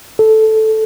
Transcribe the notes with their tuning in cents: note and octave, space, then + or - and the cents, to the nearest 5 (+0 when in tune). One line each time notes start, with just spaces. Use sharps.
A4 -5